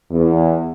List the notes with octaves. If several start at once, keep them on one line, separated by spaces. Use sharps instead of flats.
E2